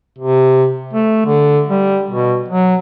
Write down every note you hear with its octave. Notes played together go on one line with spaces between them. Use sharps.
C3
A3
D3
G3
B2
F#3